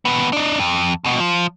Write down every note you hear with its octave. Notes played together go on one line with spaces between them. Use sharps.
D#2 B3
D4 D#4
F2
D#2 B2
F3